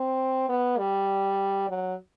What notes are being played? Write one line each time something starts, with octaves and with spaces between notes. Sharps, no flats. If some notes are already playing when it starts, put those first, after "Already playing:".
Already playing: C4
B3
G3
F#3